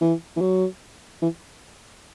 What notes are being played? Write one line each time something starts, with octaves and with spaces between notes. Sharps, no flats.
E3
E3
F#3
E3